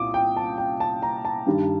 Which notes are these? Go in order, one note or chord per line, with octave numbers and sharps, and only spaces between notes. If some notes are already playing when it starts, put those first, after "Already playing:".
Already playing: C2 A#2 D6 D#6
G5
A5
G5
A5
A#5
A5
G2 D#3 G3